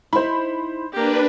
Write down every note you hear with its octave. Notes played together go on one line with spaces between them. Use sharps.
D#4 E4 C5 B5
A#3 D4 G4 B4